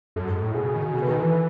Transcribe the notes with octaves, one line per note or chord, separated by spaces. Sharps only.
F#2 A4
G#2
A2
B2 G#4
C#3 G#4
D#3
C#3 F#4
B2 G#4
B4
D#3 A4
E3 B4